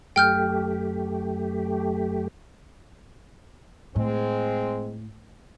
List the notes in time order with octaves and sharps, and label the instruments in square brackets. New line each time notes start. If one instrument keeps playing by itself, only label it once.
[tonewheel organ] F#2 A3 G4 [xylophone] G5 F6 G6
[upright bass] A2 [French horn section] G#3 C4